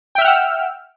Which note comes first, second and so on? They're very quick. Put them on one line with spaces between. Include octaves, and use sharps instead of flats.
G5 E5 F6 F#5 E6